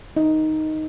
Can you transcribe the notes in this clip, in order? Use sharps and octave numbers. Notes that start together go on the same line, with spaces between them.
D#4